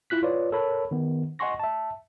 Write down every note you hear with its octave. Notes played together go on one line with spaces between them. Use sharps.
E4 F4 F#6 B6
F4 B4 C#5 D5
A4 A#4 C#5 B5
D#3 B3
D#5 F#5 G#5 C6 C#6 A#6
E5 A5